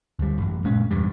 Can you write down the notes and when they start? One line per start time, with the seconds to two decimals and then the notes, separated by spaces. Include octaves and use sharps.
0.19 D2 G3
0.38 A1 F#2
0.64 A#2 G#3 C#4
0.91 D#1 E2 G2 G3